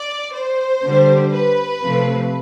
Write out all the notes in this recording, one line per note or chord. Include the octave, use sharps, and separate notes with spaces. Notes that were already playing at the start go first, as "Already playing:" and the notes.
Already playing: D5
C5
D3 G3
B4
C3 F3 A3